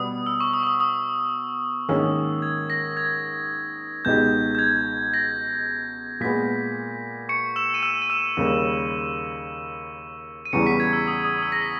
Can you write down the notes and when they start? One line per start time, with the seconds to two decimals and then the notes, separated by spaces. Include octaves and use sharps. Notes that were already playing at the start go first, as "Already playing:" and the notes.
Already playing: B2 G3 B3 D#6
0.26 E6
0.40 C#6
0.53 D#6
0.63 C#6
0.67 D#6
0.80 D#6
1.89 G#2 D#3 A#3 C#4 G#4 E6
2.42 G#6
2.70 A#6
2.97 G#6
4.05 C#2 B2 G#3 D#4 G4 G6
4.55 G6
4.59 G#6
5.14 A#6
6.21 A#2 G#3 B3 B6
7.29 C#6 C#7
7.56 E6 E7
7.74 D#7
7.83 E6 E7
8.02 D#7
8.10 E6 E7
8.37 D#2 C#3 G3 A#3
10.45 D#7
10.53 E2 C#3 E3 G3 B3 C#6 C#7
10.67 B6
10.80 G#6
10.93 E6
11.08 D#6
11.24 D#6
11.38 D#6
11.42 E6
11.52 A#6
11.62 B6